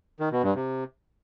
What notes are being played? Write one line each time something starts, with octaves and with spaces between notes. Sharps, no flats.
D#3
B2
G2
C3